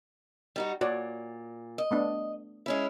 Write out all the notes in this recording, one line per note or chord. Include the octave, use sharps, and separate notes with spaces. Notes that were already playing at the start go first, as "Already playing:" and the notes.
G3 D#4 F#4
A#2 F#4 C#5 D5
D#5
A3 B3 D4
G#3 C#4 E4